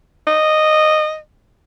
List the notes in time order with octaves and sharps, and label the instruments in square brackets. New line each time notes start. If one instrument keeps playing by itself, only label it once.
[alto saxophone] D#5